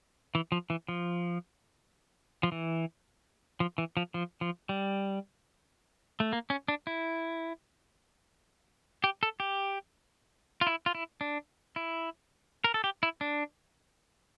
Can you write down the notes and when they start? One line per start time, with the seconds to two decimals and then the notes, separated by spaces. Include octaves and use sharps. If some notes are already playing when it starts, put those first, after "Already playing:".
0.35 E3
0.52 F3
0.70 E3
0.89 F3
2.43 F3
2.52 E3
3.60 F3
3.78 E3
3.97 F3
4.14 F3
4.41 F3
4.69 G3
6.20 A3
6.33 A#3
6.50 C#4
6.68 D4
6.87 E4
9.04 G4
9.23 A4
9.40 G4
10.61 F4
10.67 E4
10.86 F4
10.95 E4
11.21 D4
11.76 E4
12.64 A#4
12.74 A4
12.84 G4
13.03 E4
13.21 D4